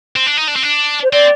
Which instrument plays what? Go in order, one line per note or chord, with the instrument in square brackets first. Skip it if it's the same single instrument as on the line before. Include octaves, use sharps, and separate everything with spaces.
[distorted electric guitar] C4
D4
D#4
D4
C4
D4
[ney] C5
[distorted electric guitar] C4 [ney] D5